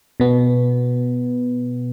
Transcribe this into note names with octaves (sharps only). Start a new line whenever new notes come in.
B2 B3